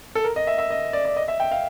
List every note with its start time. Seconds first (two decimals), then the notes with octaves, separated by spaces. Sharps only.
0.15 A4
0.24 A#4
0.36 D#5
0.47 E5
0.58 E5
0.71 D#5
0.93 D5
1.05 D5
1.17 D#5
1.28 E5
1.40 G5
1.52 F5